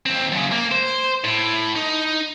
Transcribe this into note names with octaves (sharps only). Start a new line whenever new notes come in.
D#2 C4
F#2 C#3
A#3
C5
A2
D#4